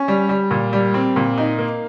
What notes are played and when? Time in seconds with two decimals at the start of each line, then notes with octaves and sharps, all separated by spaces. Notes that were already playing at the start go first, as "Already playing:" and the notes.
Already playing: C#4
0.08 G3
0.29 G3
0.51 A#2
0.73 G3
0.94 C4
1.16 A#2
1.38 D#4
1.59 A#3